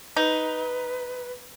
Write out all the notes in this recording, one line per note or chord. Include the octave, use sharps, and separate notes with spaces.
D#4 B4